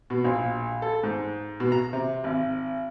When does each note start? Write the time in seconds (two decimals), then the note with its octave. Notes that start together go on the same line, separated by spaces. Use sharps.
0.10 B2
0.24 A#1
0.82 A4
1.03 G#2
1.60 B2
1.72 A#5
1.93 C3
2.24 G#1